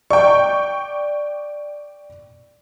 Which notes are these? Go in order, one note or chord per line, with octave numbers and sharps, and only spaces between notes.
D5 G5 C#6